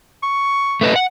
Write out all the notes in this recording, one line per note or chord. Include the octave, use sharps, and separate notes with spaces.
C#6
A3 B4 D#5
F#5